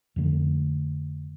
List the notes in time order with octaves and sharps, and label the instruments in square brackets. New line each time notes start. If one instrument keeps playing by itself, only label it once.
[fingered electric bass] F2 D3 A3